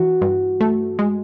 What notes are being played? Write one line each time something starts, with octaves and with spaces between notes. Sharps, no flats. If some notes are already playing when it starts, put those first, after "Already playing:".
Already playing: E3 F#4
G2
A3
G#3